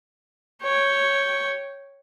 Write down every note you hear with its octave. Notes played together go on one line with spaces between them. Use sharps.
C#5 G5